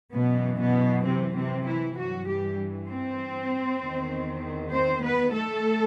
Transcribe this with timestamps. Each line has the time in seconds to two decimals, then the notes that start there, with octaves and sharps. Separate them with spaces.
0.13 F#2 B2 E3 B3
0.60 B2 B3
1.05 C3 C4
1.35 C3 C4
1.66 E3 E4
1.96 G2 E3 F#3 F#4
2.27 G3 G4
2.89 C4 C5
3.81 E2 D#3
4.72 C4 C5
5.02 B3 B4
5.33 A3 A4